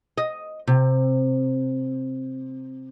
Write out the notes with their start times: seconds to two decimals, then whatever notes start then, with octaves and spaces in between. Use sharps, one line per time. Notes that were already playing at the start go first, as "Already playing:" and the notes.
0.18 D#5
0.67 C3